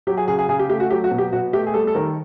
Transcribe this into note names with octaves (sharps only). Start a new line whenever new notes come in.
F#3 G4
G#4
C#3 G#4
G#4
C#3 G#4
G4
A3 G4
F#4
F#3 G4
F#4
B2
G4
B2 F#4
A3 G4
G#4
G3 A4
A4
D#3 A#4